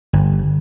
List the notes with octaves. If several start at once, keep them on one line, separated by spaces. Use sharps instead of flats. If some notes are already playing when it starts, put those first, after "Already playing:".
G1